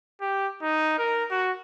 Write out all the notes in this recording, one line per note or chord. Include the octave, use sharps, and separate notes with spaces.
G4
D#4
A#4
F#4